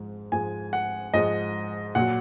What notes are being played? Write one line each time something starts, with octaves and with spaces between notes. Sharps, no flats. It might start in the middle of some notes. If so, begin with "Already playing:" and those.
Already playing: G#2 F3 G#3
G#2 F3 G#3 G#5
F#5
G#2 F3 G#3 D#5
A#2 F#3 F#5